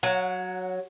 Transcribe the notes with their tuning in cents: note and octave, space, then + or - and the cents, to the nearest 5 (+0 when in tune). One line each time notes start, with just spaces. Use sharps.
F#3 +0 F#5 -30